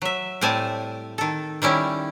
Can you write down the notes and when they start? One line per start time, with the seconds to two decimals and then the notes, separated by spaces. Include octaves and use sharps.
0.02 F#3 E5
0.41 A2 G3 C4 G#5 A5
1.18 D#3 A4
1.62 D#3 G3 C#4 E4